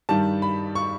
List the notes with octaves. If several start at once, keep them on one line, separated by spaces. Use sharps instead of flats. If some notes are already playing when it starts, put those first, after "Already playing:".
G2 D#3 G3 A5
B5
C#6